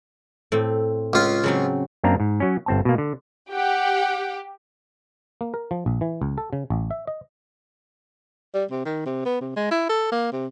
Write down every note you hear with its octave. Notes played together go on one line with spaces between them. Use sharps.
A2 C4
C#2 F4
C#3 F#3 C4
F#2 A#3 C4 D4 A#5
G#2
F#3 C#4
G1 C4 A5
B2 A#3
D3
G4 F#5 G5
A#3
A#4
F3
A#1
E3
C#2
A4
C#3
A1
E5
D#5
G3
C3
D#3
C3
B3
C3
G#3
E4
A4
A#3
C3